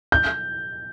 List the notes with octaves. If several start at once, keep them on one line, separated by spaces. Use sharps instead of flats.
G6